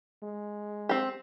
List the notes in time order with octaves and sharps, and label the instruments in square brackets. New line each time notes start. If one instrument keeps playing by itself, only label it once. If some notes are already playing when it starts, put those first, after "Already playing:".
[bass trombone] G#3
[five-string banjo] C4 G4